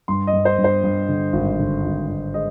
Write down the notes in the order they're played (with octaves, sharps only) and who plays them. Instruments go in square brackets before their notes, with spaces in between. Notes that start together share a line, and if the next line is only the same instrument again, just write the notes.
[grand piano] G2 C6
D#5
G2
C5
G2
C5
G2
D3
G#1
D3
G#1
G#1
G#3 D#5